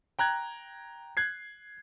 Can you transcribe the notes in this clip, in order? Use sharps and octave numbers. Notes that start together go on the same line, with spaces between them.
G5 A#5 F#6 G#6
F#6 G#6 C7